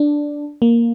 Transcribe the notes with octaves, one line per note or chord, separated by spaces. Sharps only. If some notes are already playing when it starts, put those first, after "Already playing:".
Already playing: D4
A#3